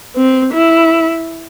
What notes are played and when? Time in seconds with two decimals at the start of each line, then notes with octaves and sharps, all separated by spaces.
0.16 C4
0.54 E4